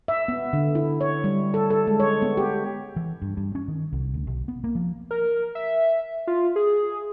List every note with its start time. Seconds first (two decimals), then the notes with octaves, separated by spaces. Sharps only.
0.08 E5
0.28 B3
0.53 D3
0.75 E4
1.01 C#5
1.24 G3
1.54 A4
1.70 A4
1.87 G#3
2.00 C#5
2.22 B3
2.37 G4
2.96 E3
3.22 G2
3.37 G2
3.55 C#4
3.68 D#3
3.93 C2
4.14 D2
4.27 B1
4.48 B3
4.64 A#3
4.75 F3
5.11 A#4
5.55 E5
6.27 F4
6.56 G#4